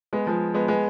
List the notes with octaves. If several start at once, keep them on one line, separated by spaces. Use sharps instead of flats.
G#3 B3
F3 G#3
G#3 B3
G#3 B3